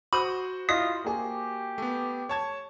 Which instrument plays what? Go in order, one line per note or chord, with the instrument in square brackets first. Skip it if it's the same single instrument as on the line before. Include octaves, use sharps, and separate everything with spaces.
[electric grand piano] F#4 C5 F#5 [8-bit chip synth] B5 [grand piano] D#6
[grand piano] E4 D#5 A#6 [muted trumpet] F4 [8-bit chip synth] D#6
[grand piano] A#3 G#4 [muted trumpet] G4
[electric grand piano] A3 B3
[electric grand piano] C#5 A5 G#6 [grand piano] C#6